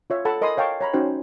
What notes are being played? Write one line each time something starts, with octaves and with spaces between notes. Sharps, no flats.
F4 C#5 E5
A4 F#5 A5 B5
A#4 D#5 G#5 B5 C6 D#6
C#5 F5 G5 A5 C#6
C#5 A#5 B5
C#4 D#4 F#4 C5 G5